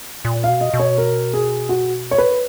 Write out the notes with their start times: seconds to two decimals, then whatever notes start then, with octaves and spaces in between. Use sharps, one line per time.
0.25 A#2
0.44 F5
0.49 B2
0.61 D#5
0.74 B2
0.80 C#5
0.98 A#4
1.34 G#4
1.69 F#4
2.11 C#5
2.18 B4